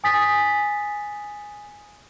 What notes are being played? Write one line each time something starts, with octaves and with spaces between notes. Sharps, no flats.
G#5 D#6 A6 B6